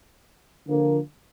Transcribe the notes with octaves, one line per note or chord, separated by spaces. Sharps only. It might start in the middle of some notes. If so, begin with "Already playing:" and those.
D3 F3 A#3